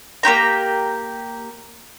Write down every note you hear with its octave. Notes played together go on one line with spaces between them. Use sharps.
A#3 F#4 G4 A#5